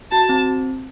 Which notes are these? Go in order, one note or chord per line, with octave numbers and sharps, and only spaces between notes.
F#4 A5
C4